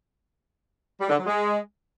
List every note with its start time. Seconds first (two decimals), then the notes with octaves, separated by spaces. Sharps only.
1.01 G3
1.09 D3
1.18 F#3
1.27 G#3